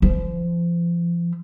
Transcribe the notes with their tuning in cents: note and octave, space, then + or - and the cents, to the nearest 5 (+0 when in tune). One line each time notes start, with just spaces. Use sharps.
F3 -35